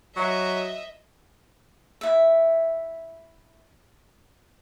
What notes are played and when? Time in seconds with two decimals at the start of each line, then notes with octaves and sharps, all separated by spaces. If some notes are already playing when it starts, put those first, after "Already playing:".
0.16 F#3 D#5 E5
2.01 E4 E5